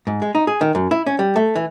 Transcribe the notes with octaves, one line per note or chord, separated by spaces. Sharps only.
G#2
G#3
D#4
G#4
D#3
F#2
E4
C#4
G3
A3
E3